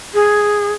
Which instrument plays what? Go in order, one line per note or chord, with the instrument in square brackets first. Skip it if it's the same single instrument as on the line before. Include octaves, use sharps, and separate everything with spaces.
[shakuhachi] G#4